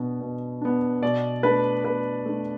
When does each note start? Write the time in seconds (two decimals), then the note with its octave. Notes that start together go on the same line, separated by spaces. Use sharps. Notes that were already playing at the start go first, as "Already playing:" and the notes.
Already playing: B2 B3 D4
0.21 B2
0.61 B3 D4
1.02 B2 D5
1.43 A3 D4 B4
1.85 B2 B4
2.26 A3 D4